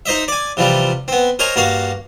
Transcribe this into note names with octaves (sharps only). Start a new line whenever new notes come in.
D#4 C5 D#5 E5
D5 G#5
C3 E3 F3 G3
B3 C4
A#4 C5 C#5 D#5 G#5 A#5
G2 A#3 F#4 F5